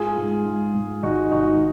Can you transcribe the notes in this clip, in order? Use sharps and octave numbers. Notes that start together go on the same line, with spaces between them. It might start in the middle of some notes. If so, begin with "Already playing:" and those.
Already playing: G#2 F4 G#4
G#2
G#2
G#2
G#1 D#4 F#4
G#1 D#4 F#4